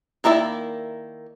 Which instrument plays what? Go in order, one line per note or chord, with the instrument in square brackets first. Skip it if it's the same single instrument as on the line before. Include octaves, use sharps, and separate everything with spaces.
[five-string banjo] D#3 A#3 E4 D5 E5